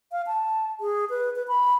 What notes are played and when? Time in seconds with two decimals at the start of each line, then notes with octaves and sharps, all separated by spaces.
0.12 F5
0.27 A5
0.80 G#4
1.10 B4
1.36 B4
1.48 B5